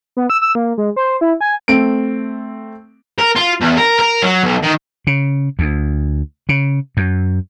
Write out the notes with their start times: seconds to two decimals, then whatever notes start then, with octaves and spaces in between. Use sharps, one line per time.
0.17 B3
0.30 E6
0.41 E6
0.55 A#3
0.78 G#3
0.96 C5
1.21 E4
1.41 G#5
1.68 A3 C4 D7
3.19 A#4
3.36 F4
3.61 E2
3.77 A#4
3.99 A#4
4.22 F#3
4.43 B1
4.62 D#3
5.07 C#3
5.59 D2
6.49 C#3
6.97 F#2